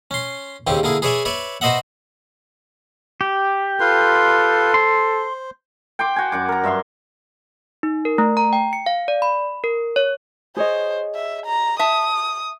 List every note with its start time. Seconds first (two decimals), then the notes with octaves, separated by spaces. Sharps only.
0.11 C#4 C6
0.67 D#2 C#3 C4 G4
0.83 D3 A#3 E4 G#4
1.02 G#4 B4 C#5 D5 E5 G#5
1.25 B4 C#5 D5 E5
1.61 F#4 B4 C5 D#5 E5 F#5
3.21 G4
3.80 F4 A4 B4 C6
4.74 C5 C6
5.99 G5 C6 D6
6.16 F#4 G#5
6.32 F#2 F#5 D6
6.49 A#4 A#5
6.64 G2 E5 F5 C6
7.83 D#4
8.05 A#4
8.18 A3
8.37 A#5
8.53 G5
8.73 C#7
8.86 F5
9.08 D5
9.22 B5
9.64 A#4
9.96 C#5
10.57 G#4 C5 C#5 D#5
11.15 E5
11.46 A#5
11.79 E5 A5 D#6